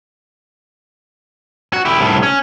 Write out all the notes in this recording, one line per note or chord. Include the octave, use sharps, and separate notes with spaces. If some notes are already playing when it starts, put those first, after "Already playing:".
F#4
E4 G4
C2 A2
C#4